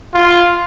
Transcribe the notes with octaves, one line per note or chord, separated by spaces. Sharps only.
F4